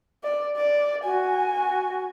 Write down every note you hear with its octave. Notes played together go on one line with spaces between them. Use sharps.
D5
D5
F#4 G#5